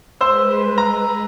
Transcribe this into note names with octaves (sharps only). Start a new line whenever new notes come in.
G#3 B4 C5 E6
A#5